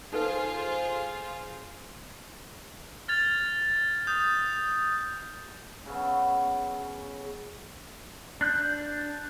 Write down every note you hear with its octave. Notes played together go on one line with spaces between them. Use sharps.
D#4 F4 G#4 A4 B4 C5
F6 G#6 A6 F7
D#6 G6
C#3 F#3 B3
D4 F#6 G6